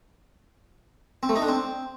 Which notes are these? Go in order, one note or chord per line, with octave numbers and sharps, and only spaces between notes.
C4
A3
D#4
D4
C4